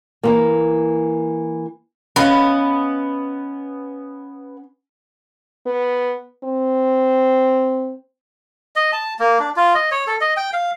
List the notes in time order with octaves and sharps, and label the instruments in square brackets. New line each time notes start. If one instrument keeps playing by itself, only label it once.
[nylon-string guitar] E3 A#3
[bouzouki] B3 [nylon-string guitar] C#4 D#5 F5
[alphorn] B3
C4
[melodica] D#5
A5
A#3
D4
F4
D#5
C#5
A4
D#5
G5
F5